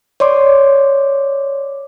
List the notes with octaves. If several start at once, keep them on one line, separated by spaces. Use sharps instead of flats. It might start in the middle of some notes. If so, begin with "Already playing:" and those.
C#5 D5 C6 D6